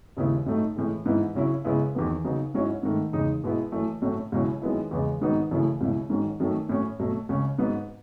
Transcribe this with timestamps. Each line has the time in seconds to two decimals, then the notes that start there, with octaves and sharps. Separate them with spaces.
0.17 D#2 C#3 G#3 B3 E4
0.46 A2 F#3 A3 D#4
0.76 A2 E3 G#3
1.06 G#2 E3 B3 E4
1.35 C#3 F#3 C#4 E4
1.65 C#3 G#3 B3 E4
1.95 E2 D#3 F#3 B3
2.24 C#3 F#3 B3 D#4
2.54 G#2 F#3 C#4 E4
2.83 G#2 D#3 A3
3.13 E2 C#3 G#3 D#4
3.44 B2 G#3 B3 E4
3.72 F#2 E3 A3
4.02 A2 F#3 A3 C#4
4.32 C#2 B2 F#3 C#4 E4
4.62 F#2 D#3 G#3 B3 E4
4.91 E2 C#3 G#3 B3
5.21 G#2 D#3 F#3 B3 D#4
5.51 F#2 C#3 E3 A3 E4
5.81 C#2 B2 F#3 C#4 E4
6.10 G#2 D#3 F#3 C#4
6.40 F#2 D#3 F#3 A3
6.69 A2 F#3 C#4
7.00 B2 F#3 A3
7.29 C#2 C#3 G#3 C#4
7.58 G#2 F#3 B3